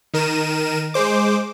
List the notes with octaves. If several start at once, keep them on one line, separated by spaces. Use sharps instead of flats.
D#3 A#4 D#7 E7
G#3 C5 D6